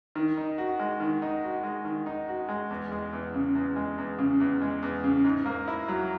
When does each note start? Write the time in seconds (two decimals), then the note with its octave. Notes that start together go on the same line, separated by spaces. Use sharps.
0.15 D#3
0.37 D#4
0.58 F#4
0.79 G#3
1.00 D#3
1.22 D#4
1.43 F#4
1.64 G#3
1.85 D#3
2.06 D#4
2.28 F#4
2.49 G#3
2.70 E2
2.92 G#3
3.13 E2
3.34 C#3
3.55 E2
3.76 G#3
3.98 E2
4.19 C#3
4.40 E2
4.62 G#3
4.82 E2
5.04 C#3
5.25 G#2
5.46 A#3
5.68 E4
5.88 F#3